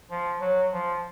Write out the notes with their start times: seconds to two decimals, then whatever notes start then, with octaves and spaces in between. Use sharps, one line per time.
0.11 F3
0.41 F#3
0.72 F3